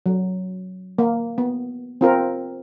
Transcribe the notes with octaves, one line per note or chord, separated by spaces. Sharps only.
F#3
A#3
B3
C4 F4 A#4